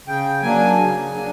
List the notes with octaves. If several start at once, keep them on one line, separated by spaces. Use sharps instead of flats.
C#3 G5
F#3 A#3 D4 G#5
C#3
F#3 A#3 D4